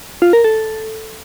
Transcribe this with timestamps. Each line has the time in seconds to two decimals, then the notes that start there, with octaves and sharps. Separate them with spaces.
0.22 F4
0.33 A#4
0.44 A4